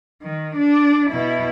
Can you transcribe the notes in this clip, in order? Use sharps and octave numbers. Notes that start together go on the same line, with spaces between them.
D#3
D4
B2 E4